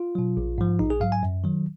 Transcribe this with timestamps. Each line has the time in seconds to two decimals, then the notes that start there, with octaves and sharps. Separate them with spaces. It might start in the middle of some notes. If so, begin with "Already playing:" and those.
Already playing: F4
0.15 B2 F#3
0.37 A#1
0.58 G#2 F3
0.79 A#1 D#4
0.90 G#4
1.01 G#2 F#3 F5
1.12 G#5
1.23 F#2
1.44 D#3 F#3